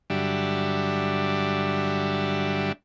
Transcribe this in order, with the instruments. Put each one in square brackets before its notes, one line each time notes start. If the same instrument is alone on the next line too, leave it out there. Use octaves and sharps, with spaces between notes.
[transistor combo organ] G2 D3 F#3 G3 D4 E5